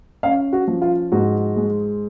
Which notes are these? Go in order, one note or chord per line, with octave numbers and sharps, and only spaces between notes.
C#4 F5
F#4
F3
F4
G#2 F#4
G#3